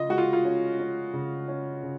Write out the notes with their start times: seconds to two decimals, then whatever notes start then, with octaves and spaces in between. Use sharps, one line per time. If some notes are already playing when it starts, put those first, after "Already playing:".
Already playing: C#3 F4 D#5
0.09 G#3 F#4
0.18 F4
0.33 F4
0.45 C#4
0.79 C#4
1.13 C#3
1.48 C#4
1.83 C#3